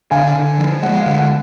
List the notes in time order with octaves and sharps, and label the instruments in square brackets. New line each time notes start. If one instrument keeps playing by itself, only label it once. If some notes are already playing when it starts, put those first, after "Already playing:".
[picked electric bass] D3 [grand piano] F5 G#5
[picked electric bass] D3
F3
[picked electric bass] G#3 [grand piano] F#5
[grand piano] F5
[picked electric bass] D3
[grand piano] F#5